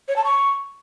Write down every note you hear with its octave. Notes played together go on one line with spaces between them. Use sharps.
C#5
A5
C#6